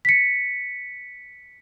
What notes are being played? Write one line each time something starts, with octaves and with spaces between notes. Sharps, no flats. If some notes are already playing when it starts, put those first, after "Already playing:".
B6 C#7